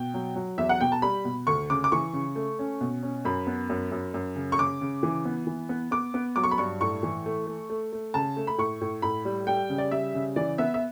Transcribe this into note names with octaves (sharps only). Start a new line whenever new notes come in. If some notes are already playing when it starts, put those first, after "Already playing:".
Already playing: B2 G5
F#3
F#3
E2 E5
F#5
B2 G5
A5
G3 B5
B2
D2 C#6
C#3 D6
D6
E3 C#6
C#3
A3
C#4
B2
C#4
F#2 B5
B3
F#2
F#2
F#2
C#3
C#6
C#3 D6
C#3
E3
B3
E3
B3
B3 D6
B3
F#3 D6
C#6
B5
G2 C#6
A2 C#6
E3
A3
A3
A3
A3
C#3 A5
A3
B5
A2 C#6
A2
A2 B5
G3
G3 G5
C#3
D5
G3 E5
C#3
E3 D5
B3 E5
E5